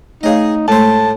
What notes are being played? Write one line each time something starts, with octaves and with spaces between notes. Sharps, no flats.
A3 D#4 G#4 C#5 D#5 F5
A2 G#3 A3 C5 A5